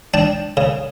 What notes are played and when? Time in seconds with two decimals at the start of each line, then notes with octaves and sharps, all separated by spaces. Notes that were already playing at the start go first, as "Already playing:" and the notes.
0.14 D4 G5 A5
0.57 C#3